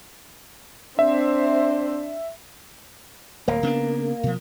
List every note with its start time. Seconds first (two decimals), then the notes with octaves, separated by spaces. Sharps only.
0.99 C4 D4 C5 E5
3.48 D1 A#3
3.63 C#3 B3 D4
4.23 B2 F3